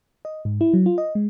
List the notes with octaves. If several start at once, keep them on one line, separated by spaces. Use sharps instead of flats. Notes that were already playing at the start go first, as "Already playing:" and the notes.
D#5
G#2
E4
F#3
F4
D#5
G#3